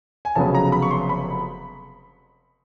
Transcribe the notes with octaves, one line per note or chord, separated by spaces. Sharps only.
G#5
F1 F2 C#3 F#3 B3 A5
A#5
B5
C#6
C6
B5